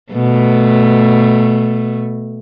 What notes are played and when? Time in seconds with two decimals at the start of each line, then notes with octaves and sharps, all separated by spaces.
0.13 B2 A3